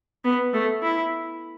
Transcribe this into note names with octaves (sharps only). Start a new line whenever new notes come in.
B3
A3
E4